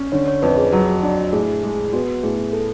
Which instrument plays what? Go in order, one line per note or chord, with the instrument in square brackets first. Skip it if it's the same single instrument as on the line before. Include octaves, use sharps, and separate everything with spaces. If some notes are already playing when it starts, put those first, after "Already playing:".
Already playing: [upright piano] C#4
[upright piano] D3 [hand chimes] C#5
[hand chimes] C#5
[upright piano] F2 [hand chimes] B4
[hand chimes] G#4
[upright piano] F#3 [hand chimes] F#4
[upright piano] D4 [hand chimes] F#4
[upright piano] A2 [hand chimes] G#4
[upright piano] G#3 [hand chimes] G#4
[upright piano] B3 [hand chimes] F#4
[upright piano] A2 [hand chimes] G#4
[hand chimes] A4